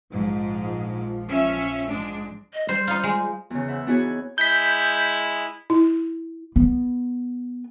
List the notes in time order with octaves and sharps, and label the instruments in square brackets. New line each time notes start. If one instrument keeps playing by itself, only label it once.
[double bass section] A#1 F3 [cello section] G#2
[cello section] C#4 E5
G#2 G#3 D4
[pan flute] D#5
[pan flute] G3 [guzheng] C5
[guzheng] D#4 F4
G#3
[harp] E2 C#3
C5 E5 F#5 B5
B3 D4 E4 F#4 G#4 C#5
D#4
[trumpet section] G#3 E4 [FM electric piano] G6 B6
[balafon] E4
[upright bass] B3